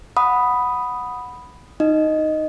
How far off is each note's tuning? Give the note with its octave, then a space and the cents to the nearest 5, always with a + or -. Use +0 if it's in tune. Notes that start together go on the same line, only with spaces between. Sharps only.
F#5 -10 B5 +0 D#6 +0
D#4 +0 D#5 +0